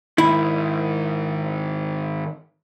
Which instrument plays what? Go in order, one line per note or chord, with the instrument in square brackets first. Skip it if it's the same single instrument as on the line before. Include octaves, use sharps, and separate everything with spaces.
[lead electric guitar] G#2 D#3 [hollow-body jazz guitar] E4